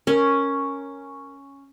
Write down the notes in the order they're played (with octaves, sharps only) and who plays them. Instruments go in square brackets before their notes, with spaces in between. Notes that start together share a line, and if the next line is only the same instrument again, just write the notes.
[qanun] C#4 [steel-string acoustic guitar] A#4